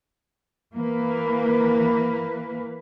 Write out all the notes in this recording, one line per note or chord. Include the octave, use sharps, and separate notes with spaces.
E3 A#3 B4